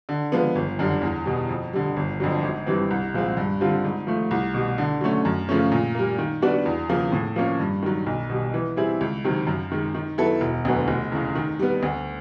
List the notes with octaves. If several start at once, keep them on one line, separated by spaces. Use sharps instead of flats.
D3
F3 G#3 B3
G1
F#2 D3 G3
E2
B2 G3
F2
D3 G3
G1
F2 D3 F#3
G#1
G2 E3 G3 C4
C2
A#2 F3 G#3 C4
G2
D3 G3 C4 F4
G#2
F3 A3
C2
B2 G3
D3
F#3 A3 C#4
F#2
C#3 F3 A3 C#4
A#2
G3 A#3
D#3
G3 B3 D4 F#4
E2
C#3 F3 A#3
A2
F3 A#3 C#4
G2
D#3 F#3
B1
B2 G3
E3
G3 C4 E4 G#4
C#2
C3 D#3 F#3
F#2
D#3 G#3
D#3
F#3 B3 E4 A4
E1
D2 D3 F#3 B3
F1
E2 C#3
D#3
G3 B3
D2